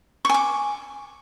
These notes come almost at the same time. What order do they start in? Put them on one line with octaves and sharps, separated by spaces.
C#6 G#5 D6